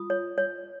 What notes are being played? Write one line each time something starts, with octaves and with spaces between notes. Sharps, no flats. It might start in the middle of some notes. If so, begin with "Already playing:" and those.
Already playing: F4 D#6
C#5
C#5